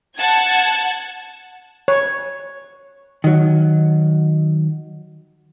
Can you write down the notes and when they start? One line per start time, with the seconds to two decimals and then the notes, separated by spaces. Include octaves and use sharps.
0.18 F#5 A5 G#6
1.88 C#5
3.24 D#3 F#3